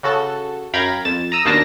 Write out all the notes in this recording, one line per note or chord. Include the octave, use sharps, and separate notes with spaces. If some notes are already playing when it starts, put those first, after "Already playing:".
C#3 F#4 A4 A5
F#2 F5 G5 A#5 B5 G#6
F2 A6 E7
A#5 D#6 E6
D#2 B2 A#3 D4 A5 A#6